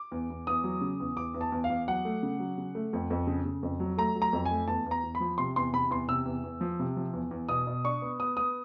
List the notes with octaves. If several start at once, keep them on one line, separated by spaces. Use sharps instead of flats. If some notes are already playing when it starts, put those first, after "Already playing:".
Already playing: D6
E2
E2
E2 D#6
F#3
C#3
E2
E2 D6
E2
A5
E2
F5
E2
F#3 F#5
A3
C#3
F#3
C#3
A3
F2
F2
C#3
C#3
F2
F#3
A3 A#5
F#3
A#5
F2
G#5
A3
E2 A5
E2 A#5
E2
B5
F3
C3 C6
E2 C6
C3 B5
E2 C6
C3 E6
E2
E2
F3
C3
F3
E2
E2
B2 D#6
B2
D4 C#6
B3
B3 D#6
B3 D#6